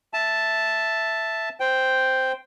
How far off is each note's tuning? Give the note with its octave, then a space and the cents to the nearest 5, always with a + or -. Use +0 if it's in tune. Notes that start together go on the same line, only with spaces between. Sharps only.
E5 +0 A5 +0
C5 -5 G5 +0